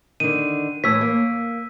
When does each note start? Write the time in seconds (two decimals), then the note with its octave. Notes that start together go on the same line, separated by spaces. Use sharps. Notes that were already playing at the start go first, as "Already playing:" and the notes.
0.20 D3 D#3 D#7
0.84 A2 E3 C#5 E6 B6
1.01 A#3